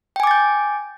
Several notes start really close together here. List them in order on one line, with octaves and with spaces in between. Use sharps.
G5 G#5 D6 A6 G6